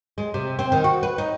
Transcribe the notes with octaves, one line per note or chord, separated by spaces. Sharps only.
G#3
C3
C4
D#3
F#4
B4
D#4